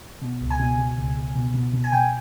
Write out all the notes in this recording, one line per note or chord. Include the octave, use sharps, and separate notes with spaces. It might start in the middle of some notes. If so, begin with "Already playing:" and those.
B2
C#2
G#5
B2
B2
C#2
C#2
B2
B2
B2
G#5
B2 G5